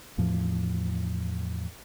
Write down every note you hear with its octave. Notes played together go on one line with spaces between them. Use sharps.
E2 A2 F3